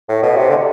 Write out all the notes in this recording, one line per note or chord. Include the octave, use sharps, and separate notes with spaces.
A2
B2
C3
D3